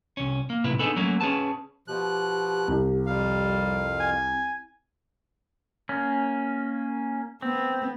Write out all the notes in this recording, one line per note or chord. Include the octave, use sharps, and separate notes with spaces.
C2 C#4
A#3
B1 A2 C3 E4 B4
B3 D4 D#4 G#4 A4 B4
F#3 A3 A#3 C#4
C#4 G#4 B4 A5
B2 F3 G4 F#6
C2
F2 G3 F5
G#5
A#3 C#4
B3 C4